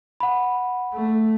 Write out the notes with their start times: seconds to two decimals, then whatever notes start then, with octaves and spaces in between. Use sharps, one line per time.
0.20 F#5 B5
0.94 A3